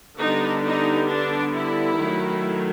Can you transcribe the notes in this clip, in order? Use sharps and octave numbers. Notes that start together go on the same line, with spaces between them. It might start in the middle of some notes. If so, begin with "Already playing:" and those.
D3 G3 B3 D4 D#4
D#4
D4
E4
D#3 F#3 A3